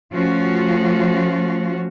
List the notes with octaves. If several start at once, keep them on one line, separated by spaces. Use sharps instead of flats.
F3 A3 C#4 F4 F#4